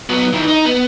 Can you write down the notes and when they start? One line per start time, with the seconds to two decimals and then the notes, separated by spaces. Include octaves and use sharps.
0.09 F#3 B3
0.33 D#3 E3
0.48 D#4
0.66 B3